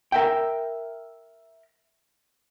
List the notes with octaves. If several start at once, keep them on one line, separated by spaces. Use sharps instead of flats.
A#4 E5 G5